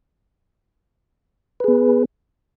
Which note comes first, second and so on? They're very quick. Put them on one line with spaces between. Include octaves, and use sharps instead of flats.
B4 G#4 B3